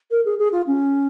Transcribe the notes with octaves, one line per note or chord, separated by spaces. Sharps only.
A#4
G#4
G#4
F4
C#4